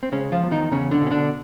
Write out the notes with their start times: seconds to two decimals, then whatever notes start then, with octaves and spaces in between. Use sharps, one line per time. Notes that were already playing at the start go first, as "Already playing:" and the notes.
0.03 C4
0.12 C#3 G#3 C#4
0.32 F3 F4
0.42 E2
0.51 D#3 D#4
0.72 E2 C#3 C#4
0.91 D3 D4
1.01 B2
1.06 C#4
1.11 D3 D4